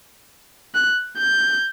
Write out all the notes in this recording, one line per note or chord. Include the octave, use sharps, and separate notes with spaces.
F#6
G6